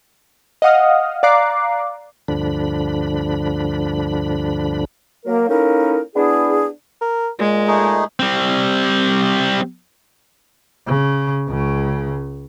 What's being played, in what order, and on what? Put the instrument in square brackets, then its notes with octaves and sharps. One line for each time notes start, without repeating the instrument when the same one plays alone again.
[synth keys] D#5 F5 F#5 D#6 F6
D5 F5 A#5 D6 F#6 C7
[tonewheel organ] D2 G2 D3 F3 D4 B5
[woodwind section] F#3 A#3 A#4
A#3 C#4 D#4 E4 A4 A#4
B3 D4 E4 G#4
[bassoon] A#4
[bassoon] A#2 [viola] G#3
[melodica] A3 D#4 G#4
[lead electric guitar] G3 C4
[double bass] C#3
C#2 C#3